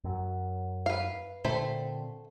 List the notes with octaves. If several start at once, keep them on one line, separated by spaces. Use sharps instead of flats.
F#2 F#3
B4 F5
A#2 D3 A3 C4 C5 B5